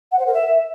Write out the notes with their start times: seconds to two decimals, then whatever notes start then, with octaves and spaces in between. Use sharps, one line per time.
0.11 F#5
0.19 C5
0.26 A#4
0.33 E5